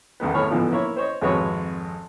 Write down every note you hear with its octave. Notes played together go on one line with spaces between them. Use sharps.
B1 E2 D#3 B3
G#1 A2 C#5 B5 F6
G#2 B2 D3 E3 F3 B3
A#3 E4 C#5
C5 C#5 D#5
G#1 F2 G#3 F#4 B4 C#5